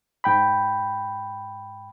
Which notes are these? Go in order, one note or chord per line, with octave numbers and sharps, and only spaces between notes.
G#2 G5 B5